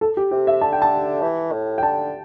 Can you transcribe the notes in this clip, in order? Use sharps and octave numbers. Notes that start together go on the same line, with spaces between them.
A4
G4
C3 G4
E5
D3 A5
G5
A5
E3
A2
G5
D3 A5